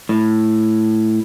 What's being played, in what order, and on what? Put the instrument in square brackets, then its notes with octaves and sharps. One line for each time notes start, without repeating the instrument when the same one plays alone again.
[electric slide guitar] A2